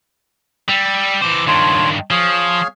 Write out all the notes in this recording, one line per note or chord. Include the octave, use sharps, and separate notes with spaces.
G3 E6
E3 C5 D6
G2 D#3 F4 C#5 A5
F3 G#4 C#5 F5